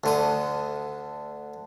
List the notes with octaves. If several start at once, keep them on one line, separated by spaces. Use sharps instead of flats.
D2 D3 D#6